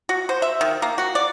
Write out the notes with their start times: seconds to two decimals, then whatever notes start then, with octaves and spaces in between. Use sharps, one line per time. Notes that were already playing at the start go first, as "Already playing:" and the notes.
0.09 F#4
0.29 C5
0.42 E5
0.61 D#3
0.82 A#3
0.98 F#4
1.15 D5